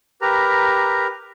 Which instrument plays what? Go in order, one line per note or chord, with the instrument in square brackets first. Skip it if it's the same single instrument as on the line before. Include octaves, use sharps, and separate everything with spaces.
[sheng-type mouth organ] G4 A#4 B4 A#5